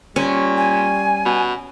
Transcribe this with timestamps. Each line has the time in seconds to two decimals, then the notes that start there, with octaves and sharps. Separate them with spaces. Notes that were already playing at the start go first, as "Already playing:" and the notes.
0.16 A#2 G3 C#4
0.58 G#5
1.25 B2